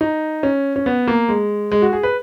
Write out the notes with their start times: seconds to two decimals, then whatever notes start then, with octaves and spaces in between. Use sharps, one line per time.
0.01 D#4
0.43 C#4
0.76 C#4
0.86 B3
1.07 A#3
1.29 G#3
1.71 G#3
1.82 F#4
1.93 G#4
2.03 B4